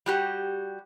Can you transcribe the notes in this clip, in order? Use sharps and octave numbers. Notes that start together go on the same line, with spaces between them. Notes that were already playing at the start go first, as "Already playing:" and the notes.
G3 F#4 G4